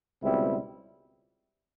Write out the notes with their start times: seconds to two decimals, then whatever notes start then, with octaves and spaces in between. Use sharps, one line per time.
0.23 C#2 B2 G3 C4 E4